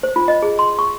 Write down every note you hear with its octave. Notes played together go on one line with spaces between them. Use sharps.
C5
F4
D#5
G#4
C6
C#6